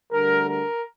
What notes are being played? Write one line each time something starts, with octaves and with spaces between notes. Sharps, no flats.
D2 D3 G3 A#4
A#4